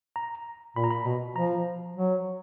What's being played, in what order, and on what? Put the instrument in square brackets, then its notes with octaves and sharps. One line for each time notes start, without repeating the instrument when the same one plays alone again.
[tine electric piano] A#5
[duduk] A#2 [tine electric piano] B5
[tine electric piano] A#5
B5
[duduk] B2
[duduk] F3 [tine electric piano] A#5
[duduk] F#3